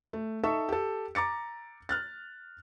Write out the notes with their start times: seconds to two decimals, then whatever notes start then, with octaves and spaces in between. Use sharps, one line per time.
0.13 A3
0.43 D#4 A4 E5 A5 C#6
0.69 G4 A4
1.15 A#5 D6 A6 C#7
1.89 F6 F#6 A6